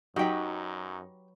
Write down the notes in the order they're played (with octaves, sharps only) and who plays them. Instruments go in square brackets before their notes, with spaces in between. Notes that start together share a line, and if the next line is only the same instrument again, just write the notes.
[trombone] F#2 [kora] F#3 B4 [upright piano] D#4 [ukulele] G4 G5